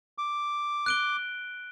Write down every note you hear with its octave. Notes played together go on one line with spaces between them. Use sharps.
D6
F#6 D7 G7